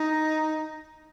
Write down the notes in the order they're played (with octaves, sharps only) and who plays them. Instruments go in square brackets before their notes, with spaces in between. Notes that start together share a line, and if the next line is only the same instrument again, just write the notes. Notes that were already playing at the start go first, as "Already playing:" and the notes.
Already playing: [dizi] D#4